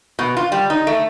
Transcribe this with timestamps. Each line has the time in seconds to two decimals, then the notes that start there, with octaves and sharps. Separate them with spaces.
0.19 B2
0.37 F4
0.52 G3
0.70 D#4
0.87 A3